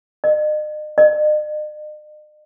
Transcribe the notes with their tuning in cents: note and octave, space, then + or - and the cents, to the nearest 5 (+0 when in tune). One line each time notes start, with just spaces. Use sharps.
D#5 -40
D#5 -45